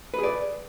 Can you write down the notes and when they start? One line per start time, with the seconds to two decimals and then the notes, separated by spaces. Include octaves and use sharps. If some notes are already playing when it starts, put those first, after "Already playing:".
0.14 B4
0.19 G#4
0.23 D5